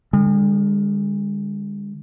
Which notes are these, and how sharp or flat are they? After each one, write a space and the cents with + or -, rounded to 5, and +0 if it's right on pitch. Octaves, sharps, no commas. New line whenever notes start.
D3 +0 G#3 -45